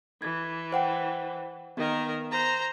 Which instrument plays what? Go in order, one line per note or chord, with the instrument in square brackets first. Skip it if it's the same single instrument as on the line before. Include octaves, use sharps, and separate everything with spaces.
[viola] E3 [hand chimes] G#6
[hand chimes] C5 F#5 G5
[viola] D#3 A#4 [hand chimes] B3
[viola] C5 A#5